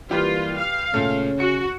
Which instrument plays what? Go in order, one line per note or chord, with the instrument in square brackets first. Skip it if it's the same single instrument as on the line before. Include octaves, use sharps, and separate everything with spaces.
[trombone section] E3 G3 A#3 [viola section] F4 [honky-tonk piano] G4 B4
[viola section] F5
[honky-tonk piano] A#2 A3 [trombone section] C#3 C#4
[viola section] F#4 [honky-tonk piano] C#7